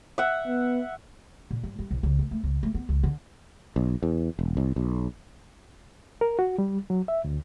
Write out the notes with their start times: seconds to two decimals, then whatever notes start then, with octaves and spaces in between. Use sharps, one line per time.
0.18 E5 F#5
0.47 B3
1.51 A#2
1.64 G2
1.79 G3
1.91 B1
2.03 C#2
2.19 A3
2.31 A3
2.44 C#2
2.63 A3
2.74 B3
2.89 C#2
3.03 D3
3.76 B1
4.03 E2
4.39 E1
4.57 C2
4.76 B1
6.21 A#4
6.39 F#4
6.58 G3
6.90 F#3
7.08 E5
7.24 D2